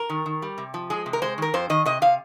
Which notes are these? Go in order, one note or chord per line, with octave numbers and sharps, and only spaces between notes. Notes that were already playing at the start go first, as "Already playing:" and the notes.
Already playing: A#4
D#3
D#3
G3
C3
F3
G#3 G#4
C3
A#4
G#3 C5
D#3 A#4
F2 C5
D#3 D#5
C3 D#5
C3 F5